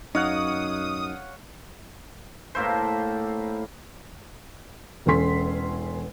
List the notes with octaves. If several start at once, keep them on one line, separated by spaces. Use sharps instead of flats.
F#2 D#4 C#5 F5 F#5 D#6
A2 A#3 E4 C5
E1 E2 C#4 A4 C6 B6